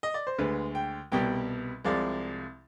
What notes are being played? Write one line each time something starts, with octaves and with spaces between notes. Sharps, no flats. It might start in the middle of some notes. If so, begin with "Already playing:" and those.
D#5
D5
C5
D2 D3 G#3 B4
G5
C2 B2 G3 G5
C2 C3 F3 G#3 D5